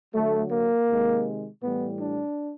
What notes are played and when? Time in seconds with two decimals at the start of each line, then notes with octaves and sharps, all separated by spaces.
0.12 D3 F#3 A3
0.51 A#3
0.88 C3 D#3 G#3
1.62 A2 E3 G3 B3
2.00 D4